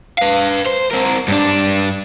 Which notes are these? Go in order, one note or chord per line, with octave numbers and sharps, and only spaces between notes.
B4 F5
C5
C4 A#4
G2 D4